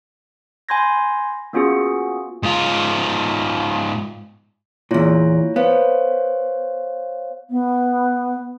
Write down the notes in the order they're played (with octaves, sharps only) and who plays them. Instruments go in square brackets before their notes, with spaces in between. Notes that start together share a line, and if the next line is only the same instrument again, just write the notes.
[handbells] G#5 B5 C6 G6 G#6 A#6
A#3 B3 C#4 F4 F#4 G#4
[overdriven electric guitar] G#2 F4
[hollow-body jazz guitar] E2 A#2 [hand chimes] E4 F4 C#5
[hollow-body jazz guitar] B3 [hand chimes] C5 C#5 F5
[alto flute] B3